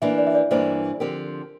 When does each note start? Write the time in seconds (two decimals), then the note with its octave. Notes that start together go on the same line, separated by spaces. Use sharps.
0.02 E3 A#3 D4 E5
0.18 D5
0.27 E5
0.35 D5
0.51 G2 E3 A#3 D4 C5
1.00 D3 F3 C4 G4 A#4